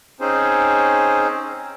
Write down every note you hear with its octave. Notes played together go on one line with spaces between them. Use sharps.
C4 C#4 D#4 G#4 C5